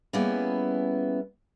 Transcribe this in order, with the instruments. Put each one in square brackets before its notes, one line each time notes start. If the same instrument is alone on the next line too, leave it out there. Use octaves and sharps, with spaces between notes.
[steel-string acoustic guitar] G3 A#3 B3 C#4 E4 G#4